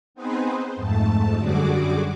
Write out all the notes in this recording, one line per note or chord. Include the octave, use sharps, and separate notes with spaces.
B3 C4 D#4 G#4 B4 C5
F2 G#2 A3 A5
F#2 D3 G3 F#4 G#4 D6